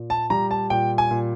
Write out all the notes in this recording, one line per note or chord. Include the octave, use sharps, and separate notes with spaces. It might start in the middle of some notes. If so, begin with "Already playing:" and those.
Already playing: A#2
A5
G3 A#5
A5
A#2 G5
G#5
A#2